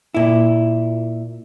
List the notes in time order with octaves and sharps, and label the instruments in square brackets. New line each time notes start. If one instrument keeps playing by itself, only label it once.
[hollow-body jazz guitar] A#2 E4